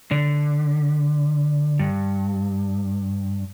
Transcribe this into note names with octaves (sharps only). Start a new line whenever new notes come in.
D3
G2